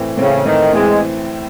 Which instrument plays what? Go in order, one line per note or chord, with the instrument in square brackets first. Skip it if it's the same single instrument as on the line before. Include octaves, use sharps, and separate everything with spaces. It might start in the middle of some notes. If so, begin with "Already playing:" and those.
Already playing: [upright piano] A2 E3 C4
[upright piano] A2 E3 C4 [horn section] C#3
[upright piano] A2 E3 C4 [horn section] D#3
[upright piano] A2 E3 C4 [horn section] G#3